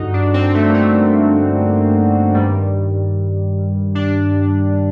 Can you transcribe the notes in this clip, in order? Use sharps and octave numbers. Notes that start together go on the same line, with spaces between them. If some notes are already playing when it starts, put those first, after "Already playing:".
Already playing: G2 D3 D#4 F#4
D4
C4
A3
A#3
A3
G2 D#3 G3
D4